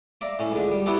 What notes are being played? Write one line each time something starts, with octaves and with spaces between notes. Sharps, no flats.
D5 E5 F5 A#5
A2 C#4 E5
C#2 D3
G3
G3 B3 E4 F#4 G4 A4